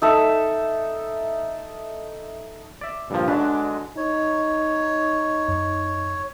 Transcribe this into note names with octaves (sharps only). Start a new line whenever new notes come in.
D#4 A4 E5
D5 E5
G2 A#2 F3
D3 F#3 G#3 D4 B4
D#4 C#5
F#2